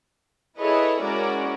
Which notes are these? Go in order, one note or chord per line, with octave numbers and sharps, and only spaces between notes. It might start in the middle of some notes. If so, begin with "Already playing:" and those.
E4 G#4 A4 B4 C#5 D#5
G#3 C#4 E4 F#4 A#4 D5